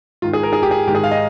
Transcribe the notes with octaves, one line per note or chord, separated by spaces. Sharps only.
G#2 D#3 F4
G#4
A#4
G#4
G4
G#4
G#2 D#3 G4
G#4
F5
D#5